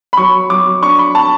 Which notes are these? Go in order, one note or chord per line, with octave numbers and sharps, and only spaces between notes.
B5
F#3 C#6
F#3 D6
D4 C#6
B5
A5